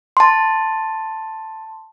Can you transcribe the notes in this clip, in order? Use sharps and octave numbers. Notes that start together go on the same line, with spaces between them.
A5 C6